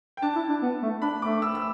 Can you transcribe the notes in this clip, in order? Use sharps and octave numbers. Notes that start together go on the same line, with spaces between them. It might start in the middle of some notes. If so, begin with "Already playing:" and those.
G5
D4 A5
E4
D4
B3
A3
D4 B5
A3 D6
E6
E6